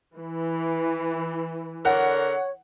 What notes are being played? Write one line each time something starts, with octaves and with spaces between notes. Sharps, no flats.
E3
D3 A#4 C#5 F#5